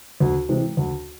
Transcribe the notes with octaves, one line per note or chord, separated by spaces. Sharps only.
D2
C3 E3 G#3
D2